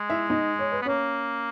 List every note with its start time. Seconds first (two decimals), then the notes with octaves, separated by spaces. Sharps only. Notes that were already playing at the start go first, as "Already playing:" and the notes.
Already playing: G#3
0.10 E4 E5
0.30 D#4 D#5
0.59 C#5
0.72 B4
0.82 B3
0.85 A#3 C#4 C#5